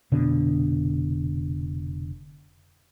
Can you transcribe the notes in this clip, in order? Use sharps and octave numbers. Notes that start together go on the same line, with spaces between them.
F1 B2 D3 D4